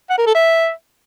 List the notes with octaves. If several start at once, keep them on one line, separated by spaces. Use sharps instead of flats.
F#5
A#4
A4
E5